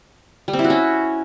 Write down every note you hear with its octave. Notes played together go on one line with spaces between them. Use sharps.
G3
C4
E4
F#4
C#4